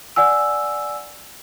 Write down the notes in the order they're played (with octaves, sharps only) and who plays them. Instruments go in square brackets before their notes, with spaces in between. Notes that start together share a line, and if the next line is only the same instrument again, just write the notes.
[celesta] D5 F#5 G#5 E6